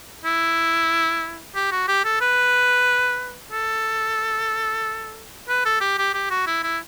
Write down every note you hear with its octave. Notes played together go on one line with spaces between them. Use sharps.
E4
G4
F#4
G4
A4
B4
A4
B4
A4
G4
G4
G4
F#4
E4
E4